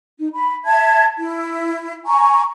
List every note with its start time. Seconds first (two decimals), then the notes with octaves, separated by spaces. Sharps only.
0.18 D#4
0.33 B5
0.65 E5 A5 G#6
1.18 E4
2.07 G#5 A#5 C#6